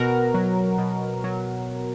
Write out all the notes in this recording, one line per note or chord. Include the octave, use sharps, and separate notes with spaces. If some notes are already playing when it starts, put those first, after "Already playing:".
Already playing: B2 F#4 A#4
F#3
B2
F#3